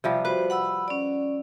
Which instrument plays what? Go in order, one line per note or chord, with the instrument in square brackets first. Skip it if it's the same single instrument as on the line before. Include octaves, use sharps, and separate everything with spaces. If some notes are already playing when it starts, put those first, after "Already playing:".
[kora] C3 F3 G3
[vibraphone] F#4 C5 [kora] B4
[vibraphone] F#5 B5 E6
C#4 D5